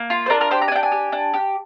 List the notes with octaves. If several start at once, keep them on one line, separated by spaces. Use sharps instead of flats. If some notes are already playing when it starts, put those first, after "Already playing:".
Already playing: A#3
F4
C5
D4 A#4
A#4
G4 C5
A#5
G#5
D4 G5
G#5
G4
D4
G4